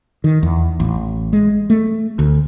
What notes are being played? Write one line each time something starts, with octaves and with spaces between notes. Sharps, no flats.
D#3
E2
A1
G#3
A3
D2